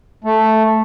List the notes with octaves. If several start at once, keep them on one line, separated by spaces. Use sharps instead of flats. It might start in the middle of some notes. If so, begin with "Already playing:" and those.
A3